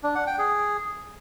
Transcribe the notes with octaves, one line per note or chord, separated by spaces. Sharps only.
D4
F#5
G5
G#4